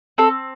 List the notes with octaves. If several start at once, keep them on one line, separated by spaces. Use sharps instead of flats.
C4 A4